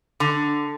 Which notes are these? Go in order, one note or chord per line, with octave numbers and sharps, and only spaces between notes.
D3